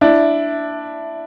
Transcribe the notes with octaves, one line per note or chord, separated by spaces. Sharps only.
D4 E4